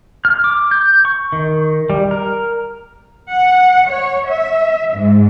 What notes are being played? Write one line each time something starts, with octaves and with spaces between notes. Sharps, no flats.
F6
D6
G6
C#6
D#3
G3
A#4
F#5
C#5
E5
G#2